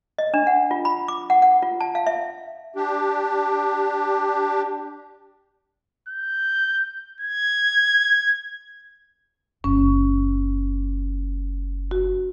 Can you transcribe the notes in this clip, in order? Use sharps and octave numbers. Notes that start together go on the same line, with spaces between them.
D#5
D4
F#5
F4
B5
D6
F#5
F#5
F4
A5
F5
E5
D4 G4
G6
G#6
F#1 C#4
F#4